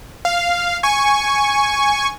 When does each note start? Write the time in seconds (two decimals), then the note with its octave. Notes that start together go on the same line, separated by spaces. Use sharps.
0.25 F5
0.83 G#5 C#6